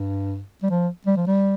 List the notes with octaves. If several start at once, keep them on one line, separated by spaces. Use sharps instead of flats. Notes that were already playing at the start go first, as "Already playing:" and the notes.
Already playing: G2
G3
F3
G3
F3
G3